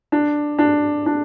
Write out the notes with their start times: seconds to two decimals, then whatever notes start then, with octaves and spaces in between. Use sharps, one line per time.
0.12 D4
0.58 D4
1.06 D4